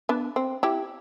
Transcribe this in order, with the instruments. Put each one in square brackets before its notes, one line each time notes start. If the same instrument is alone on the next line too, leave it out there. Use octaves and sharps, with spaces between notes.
[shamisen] B3 D4
C4
E4 G4